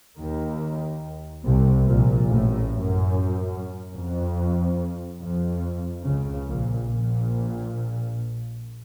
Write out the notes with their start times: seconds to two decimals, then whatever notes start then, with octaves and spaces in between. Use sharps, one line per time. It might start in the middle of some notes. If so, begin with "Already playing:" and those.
0.19 D#2 D#3
1.45 C2 C3
1.86 A#1 A#2
2.28 A1 A2
2.70 F#2
3.95 F2
5.21 F2
6.04 C#2 C#3
6.47 A#1 A#2
6.88 A#1 A#2